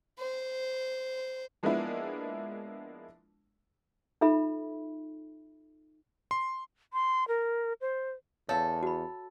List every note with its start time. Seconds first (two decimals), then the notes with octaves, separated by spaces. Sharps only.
0.19 C5
1.63 F3 G#3 A#3 B3 D4 E4
4.21 D#4 F4 A4 E5 B5
6.31 C6
6.93 C6
7.28 A#4
7.81 C5
8.49 E2 A4 C#5 F5
8.83 F#4 B5